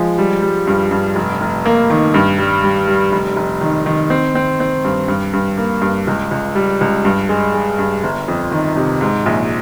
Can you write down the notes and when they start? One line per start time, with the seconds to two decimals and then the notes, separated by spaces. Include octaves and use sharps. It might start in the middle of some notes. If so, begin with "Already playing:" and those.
Already playing: F3 G#3
0.18 G3
0.42 G3
0.67 G2
0.91 G2
1.15 F1
1.41 F1
1.66 A#3
1.90 D#3
2.14 G2
2.38 G3
2.63 G3
2.88 G3
3.12 F1
3.36 F1
3.61 D#3
3.86 D#3
4.10 C4
4.35 C4
4.60 C4
4.85 G2
5.08 G2
5.33 G2
5.57 A#3
5.82 G2
6.07 C#2
6.31 C#2
6.55 G3
6.81 C#2
7.05 G2
7.29 G#3
7.54 G#3
7.79 G2
8.03 G1
8.28 F2
8.52 D#3
8.76 C3
9.01 G#2
9.26 A#1